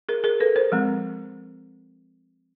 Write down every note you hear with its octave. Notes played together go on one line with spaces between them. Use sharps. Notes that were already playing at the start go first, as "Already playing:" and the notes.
G#4 A#4
G#4 A#4
A4 B4
A#4 C5
F3 G#3 C4